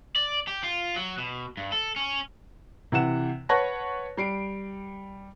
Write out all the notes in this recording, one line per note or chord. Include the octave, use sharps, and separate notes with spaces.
D5
G4
F4
F#3
B2
G2
A4
C#4
C3 E3 F#5 E7
B4 C#5 F#5 A5 C#6 A#6
G3 C7 D7